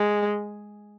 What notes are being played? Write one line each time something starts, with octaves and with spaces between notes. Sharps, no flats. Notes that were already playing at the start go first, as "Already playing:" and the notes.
Already playing: G#3